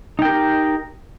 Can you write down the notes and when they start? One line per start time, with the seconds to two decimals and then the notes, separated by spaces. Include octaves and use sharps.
0.19 D#4
0.22 G5
0.25 A#4
0.28 G4